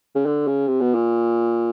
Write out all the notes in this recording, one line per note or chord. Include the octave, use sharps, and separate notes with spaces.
C#3
D3
C#3
C3
B2
A#2